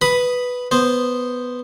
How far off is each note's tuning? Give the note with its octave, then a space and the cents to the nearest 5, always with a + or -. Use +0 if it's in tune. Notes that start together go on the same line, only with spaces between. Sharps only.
B4 +0 B5 +0 D#6 +0
B3 +5 C5 +0